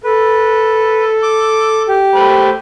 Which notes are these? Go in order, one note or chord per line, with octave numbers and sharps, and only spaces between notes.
A4 B4
D6
G4
A3 C5 B5